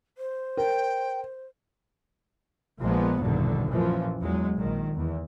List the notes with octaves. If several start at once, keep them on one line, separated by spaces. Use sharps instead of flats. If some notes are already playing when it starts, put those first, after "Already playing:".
C5
A#4 G5
A#1 A#2 F3 G#3 A#3 B3
A#1 E2 G2 B2 D3 D#3
F#2 A#2 E3 F3
E2 F#3 G#3
A#1 D#3
E2